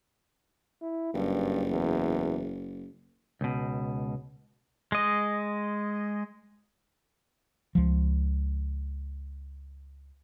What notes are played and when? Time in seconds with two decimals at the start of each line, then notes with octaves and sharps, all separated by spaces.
0.82 E4
1.14 F#1 G2
1.70 E2
3.41 C#2 B2
4.92 G#3 D#5
7.75 C#2 F3